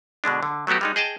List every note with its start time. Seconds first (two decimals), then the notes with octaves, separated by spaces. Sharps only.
0.24 B2 D3 G#3 D4
0.43 D3
0.67 F#3 A3 B3 F#4 G4
0.81 G3 G#3 D#4
0.96 G#4 D#5 G5 A5